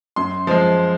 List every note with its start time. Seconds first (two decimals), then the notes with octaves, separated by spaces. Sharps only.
0.16 F#2 C6
0.47 F3 G#3